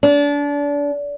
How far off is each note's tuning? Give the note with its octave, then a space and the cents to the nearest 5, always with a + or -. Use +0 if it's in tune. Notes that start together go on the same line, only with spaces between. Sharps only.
D4 -30